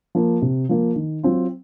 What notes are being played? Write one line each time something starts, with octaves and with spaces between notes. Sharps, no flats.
F3 A#3
C3
F3 A#3
D#3
F#3 C4 F4